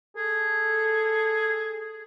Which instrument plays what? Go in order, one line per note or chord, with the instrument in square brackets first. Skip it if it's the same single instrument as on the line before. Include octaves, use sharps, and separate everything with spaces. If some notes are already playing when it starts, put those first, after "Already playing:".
[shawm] G#4 [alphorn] A4